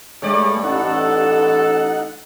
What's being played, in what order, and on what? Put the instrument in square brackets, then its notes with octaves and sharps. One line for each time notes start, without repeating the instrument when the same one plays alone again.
[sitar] G2 D5 [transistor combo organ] G#3 A3 C#5
[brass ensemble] A1 A4 [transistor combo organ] D#4 F#5